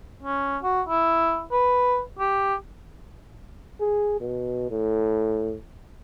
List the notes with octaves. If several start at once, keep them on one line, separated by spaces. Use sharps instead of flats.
C#4
F#4
E4
B4
G4
G#4
B2
A2